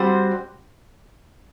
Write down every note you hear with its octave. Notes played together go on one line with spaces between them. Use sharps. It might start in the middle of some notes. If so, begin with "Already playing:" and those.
Already playing: G3 C4 F#4 C5